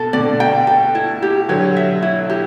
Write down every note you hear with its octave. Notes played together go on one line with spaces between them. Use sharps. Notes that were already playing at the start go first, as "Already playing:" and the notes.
Already playing: B2 A4
B2 D3 D5
G5
A4
E4
G4
D3 F#3 C#5
E5
E4
G4